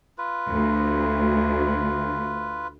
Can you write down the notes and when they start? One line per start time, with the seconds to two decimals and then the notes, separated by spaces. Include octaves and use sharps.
0.18 F4 B4
0.50 D2